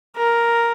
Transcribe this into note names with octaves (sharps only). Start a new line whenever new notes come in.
A#4